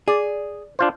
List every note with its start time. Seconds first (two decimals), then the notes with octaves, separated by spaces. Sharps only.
0.08 G#4 D5
0.79 D4 F4 C5